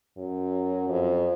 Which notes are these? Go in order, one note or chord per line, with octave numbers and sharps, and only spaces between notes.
F#2
F2